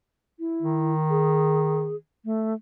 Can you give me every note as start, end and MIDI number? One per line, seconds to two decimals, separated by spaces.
0.39 0.93 64
0.63 1.96 51
1.10 1.96 68
2.25 2.54 57